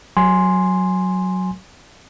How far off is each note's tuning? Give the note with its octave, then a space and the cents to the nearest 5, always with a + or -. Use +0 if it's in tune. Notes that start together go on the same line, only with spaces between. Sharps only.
F#3 +0 G#5 +0 C6 +0